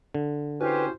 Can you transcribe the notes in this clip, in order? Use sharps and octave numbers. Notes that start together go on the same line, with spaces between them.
D3
C#4 E4 F#4 G4 B4 C5